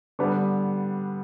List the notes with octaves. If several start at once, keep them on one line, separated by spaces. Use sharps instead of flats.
D3 G3 B3 D4